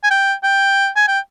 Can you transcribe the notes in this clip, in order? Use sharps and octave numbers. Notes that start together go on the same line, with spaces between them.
G#5
G5
G5
G#5
G5